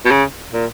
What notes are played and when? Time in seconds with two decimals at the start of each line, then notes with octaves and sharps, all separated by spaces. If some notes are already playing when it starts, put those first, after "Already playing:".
0.05 B2
0.11 C#3
0.53 A#2